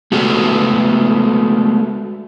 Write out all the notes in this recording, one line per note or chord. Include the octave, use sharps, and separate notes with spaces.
G#3 A3 B3 F#4 A4